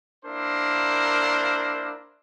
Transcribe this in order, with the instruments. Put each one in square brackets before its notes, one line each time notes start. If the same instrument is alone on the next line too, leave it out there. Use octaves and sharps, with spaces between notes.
[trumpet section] A#3 D4 E4 A#4 C5